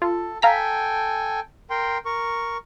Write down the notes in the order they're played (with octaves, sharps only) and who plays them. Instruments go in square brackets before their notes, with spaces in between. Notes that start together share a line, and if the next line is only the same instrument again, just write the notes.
[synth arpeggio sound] F4 [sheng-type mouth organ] A4
[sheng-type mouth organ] A4 G5 G#5 [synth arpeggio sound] F5 A#5 B6
[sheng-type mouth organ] A#4 G5 C6
A#4 C#6